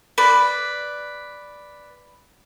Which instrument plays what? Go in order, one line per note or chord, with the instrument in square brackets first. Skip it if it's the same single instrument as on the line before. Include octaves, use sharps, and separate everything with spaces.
[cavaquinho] B4 D5